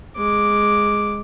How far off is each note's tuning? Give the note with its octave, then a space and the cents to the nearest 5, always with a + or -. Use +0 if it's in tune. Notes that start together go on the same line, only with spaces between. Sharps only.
G#3 +0 D6 +0